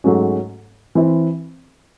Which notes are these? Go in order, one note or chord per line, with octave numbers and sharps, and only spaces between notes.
G#2 F#3 A3 C#4 F#4
E3 C4 E4